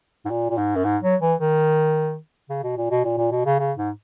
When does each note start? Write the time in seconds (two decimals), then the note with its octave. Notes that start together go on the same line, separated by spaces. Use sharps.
0.25 G#2
0.30 A#2
0.50 A#2
0.57 G#2
0.75 F#2
0.84 G#2
1.03 F#3
1.22 E3
1.40 D#3
2.49 C#3
2.63 B2
2.77 A#2
2.90 B2
3.04 A#2
3.18 A#2
3.31 B2
3.46 C#3
3.59 C#3
3.77 G#2